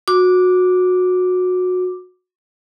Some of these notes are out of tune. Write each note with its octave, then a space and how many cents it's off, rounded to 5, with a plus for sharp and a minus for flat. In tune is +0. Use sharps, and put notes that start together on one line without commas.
F#4 -20 D6 +0